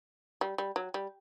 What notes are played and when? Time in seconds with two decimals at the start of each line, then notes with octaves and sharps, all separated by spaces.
0.41 G3
0.58 G3
0.76 F#3
0.94 G3